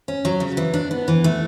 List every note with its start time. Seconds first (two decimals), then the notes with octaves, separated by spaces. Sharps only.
0.08 C#4
0.25 F#3
0.40 C#3
0.57 E3
0.74 D4
0.91 B3
1.08 E3
1.24 A3